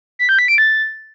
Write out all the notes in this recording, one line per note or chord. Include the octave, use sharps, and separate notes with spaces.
B6
G6
B6
D7
A6